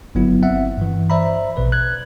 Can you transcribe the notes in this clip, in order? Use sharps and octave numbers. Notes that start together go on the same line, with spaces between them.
G1 F#3 B3 E4
C4 E5 F#5
G2 E3
C5 D5 E5 A#5 B5
A#1 B2 B4 D5
F#6 G#6